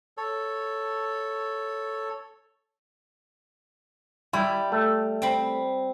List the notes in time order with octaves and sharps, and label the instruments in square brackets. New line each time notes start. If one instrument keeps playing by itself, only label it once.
[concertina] A4 C#5
[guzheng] G3 [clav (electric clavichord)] E4
[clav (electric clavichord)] A3
[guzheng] C4 B5